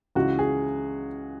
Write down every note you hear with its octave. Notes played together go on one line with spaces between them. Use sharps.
C#2 C#3 E3 F#4
G#4